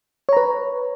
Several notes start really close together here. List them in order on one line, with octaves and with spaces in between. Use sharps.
C#5 A#5 B4